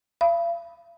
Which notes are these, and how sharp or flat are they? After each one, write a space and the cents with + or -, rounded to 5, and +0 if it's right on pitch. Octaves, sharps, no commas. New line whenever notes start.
F5 -45 B5 -5 D#6 +40